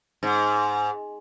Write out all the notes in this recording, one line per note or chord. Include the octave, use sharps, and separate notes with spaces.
G#2